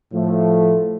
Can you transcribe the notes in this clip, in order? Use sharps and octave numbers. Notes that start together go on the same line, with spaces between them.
A2 F3 A3